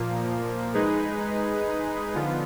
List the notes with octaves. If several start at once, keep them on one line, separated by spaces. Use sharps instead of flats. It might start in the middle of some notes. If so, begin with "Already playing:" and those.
Already playing: A#2 F3 A#3
G#3 D#4 G#4 B4
D3 F3 B3 F4